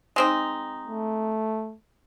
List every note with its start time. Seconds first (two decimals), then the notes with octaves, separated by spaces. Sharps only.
0.16 G#3 C4 D#4
0.87 A3